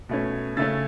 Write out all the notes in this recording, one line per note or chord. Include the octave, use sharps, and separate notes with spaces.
B2 A3 C#4
C#3 A3 C#4 E6 A6